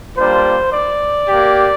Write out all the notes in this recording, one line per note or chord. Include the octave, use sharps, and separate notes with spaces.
G3 A#3 D4 F4 C5
D5
A#3 G4